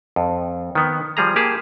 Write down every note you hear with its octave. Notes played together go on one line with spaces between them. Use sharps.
F2
D#3 B3
F3 G3 G#4 A#5
A#3 G4 G#4 A5